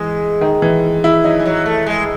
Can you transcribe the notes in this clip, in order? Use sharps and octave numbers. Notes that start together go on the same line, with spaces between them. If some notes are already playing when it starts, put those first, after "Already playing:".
Already playing: E3 G#3
D#3
E3
E4
F#3 D#4
E3
F#3
A3
G#3